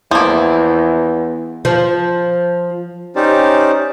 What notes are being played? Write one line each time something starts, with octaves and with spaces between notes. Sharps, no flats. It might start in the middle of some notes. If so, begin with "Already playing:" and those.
E2 F3 A#3 E4
F3
C#4 D#4 G4 C5 D5